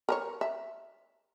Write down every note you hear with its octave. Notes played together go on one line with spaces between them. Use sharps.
A#4 C5 C#5
E5